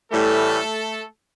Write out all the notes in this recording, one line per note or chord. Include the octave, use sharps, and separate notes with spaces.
A2 E3 G3 A3 A4